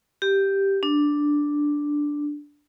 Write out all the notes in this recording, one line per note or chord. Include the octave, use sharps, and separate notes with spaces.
G4
D4